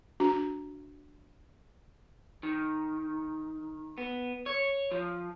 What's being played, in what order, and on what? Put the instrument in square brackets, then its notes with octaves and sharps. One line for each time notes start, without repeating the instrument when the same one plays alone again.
[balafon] D4 F#4 A#5
[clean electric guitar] D#3
B3
C#5
F3